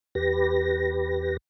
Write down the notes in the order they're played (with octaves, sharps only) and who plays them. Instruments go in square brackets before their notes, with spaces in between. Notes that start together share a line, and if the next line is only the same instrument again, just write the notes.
[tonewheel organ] E2 G4 B4 A#6